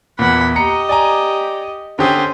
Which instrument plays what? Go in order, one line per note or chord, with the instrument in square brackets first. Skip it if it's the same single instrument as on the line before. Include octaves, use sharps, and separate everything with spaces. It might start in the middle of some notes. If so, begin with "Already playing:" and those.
[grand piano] E2 A#2 [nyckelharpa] F#5 B5
[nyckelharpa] G4 D#5 [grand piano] A#5 C#7
[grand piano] D5 G#5 A#5
[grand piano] D3 G4 D#6 [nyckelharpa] C#4 C5